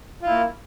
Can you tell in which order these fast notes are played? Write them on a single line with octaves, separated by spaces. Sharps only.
F4 E4 A#3